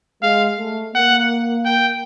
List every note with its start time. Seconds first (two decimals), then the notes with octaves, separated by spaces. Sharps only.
0.23 G#3 F5
0.59 A3
0.95 A#3 F#5
1.65 G5